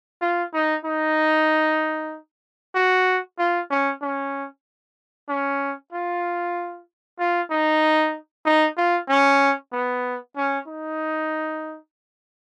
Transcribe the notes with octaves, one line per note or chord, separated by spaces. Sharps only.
F4
D#4
D#4
F#4
F4
C#4
C#4
C#4
F4
F4
D#4
D#4
F4
C#4
B3
C#4
D#4